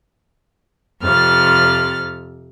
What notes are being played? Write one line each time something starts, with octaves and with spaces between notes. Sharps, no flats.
F2 C3 F6 A6